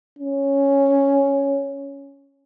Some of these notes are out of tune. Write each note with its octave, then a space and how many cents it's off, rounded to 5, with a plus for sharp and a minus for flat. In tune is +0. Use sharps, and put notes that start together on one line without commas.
C#4 +0